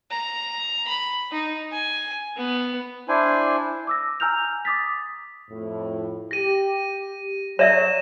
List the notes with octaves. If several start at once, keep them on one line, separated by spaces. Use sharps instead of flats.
A#5
B5
D#4
G#5
B3
D4 E4 C5 G#5
D6 E6 A#6
G#5 A#5 E6 F6 G6 F7
D6 D#6 A6 B6
F2 A2
G4 A#6 D#7
F#3 C#5 D5 E5 D#7 E7